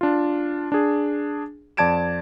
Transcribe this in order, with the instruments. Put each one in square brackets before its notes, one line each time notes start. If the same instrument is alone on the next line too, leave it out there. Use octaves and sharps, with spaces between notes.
[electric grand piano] D4 F4
D4 G#4
F2 D5 A5 G#6 D7 E7